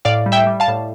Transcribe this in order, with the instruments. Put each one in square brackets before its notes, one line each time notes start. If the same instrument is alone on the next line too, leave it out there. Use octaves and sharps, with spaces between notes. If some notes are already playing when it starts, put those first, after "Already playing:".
[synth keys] A2 D5 F5
G3
E5 G5
G3
F5 A5
A2